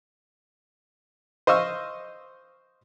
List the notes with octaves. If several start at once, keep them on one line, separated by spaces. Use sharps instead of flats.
C5 D#5 F5 C#6 E6